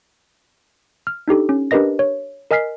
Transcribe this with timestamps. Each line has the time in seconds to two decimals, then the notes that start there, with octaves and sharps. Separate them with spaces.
1.07 F6
1.28 D4 D#4 G4 A4
1.49 C#4
1.71 D4 G4 A#4 B4 D#5 A#6
1.99 C#5
2.51 A#4 D#5 G#5 F6 B6 C7